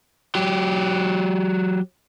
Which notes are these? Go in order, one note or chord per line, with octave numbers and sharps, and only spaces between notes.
F#3 G4